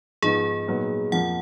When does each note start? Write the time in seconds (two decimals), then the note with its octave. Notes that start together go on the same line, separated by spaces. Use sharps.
0.22 G#2 F3 B3 D#4 G#4
0.68 A#2 F#3 B3 D#4
1.12 F2 F3 A#3 F#5